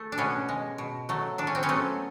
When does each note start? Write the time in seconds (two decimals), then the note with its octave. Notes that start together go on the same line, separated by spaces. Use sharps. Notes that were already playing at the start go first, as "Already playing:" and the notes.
Already playing: A3
0.12 D4
0.18 B2 B3 C#4
0.49 G#3
0.78 B2
1.09 F#3 A3
1.38 A2 D4
1.47 C#4
1.55 C4
1.63 B3 C#4
1.69 F#3 A3